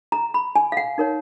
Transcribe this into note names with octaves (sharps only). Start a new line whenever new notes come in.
A#5
B5
G#5
F5
F#5
D#4 A#4 C#5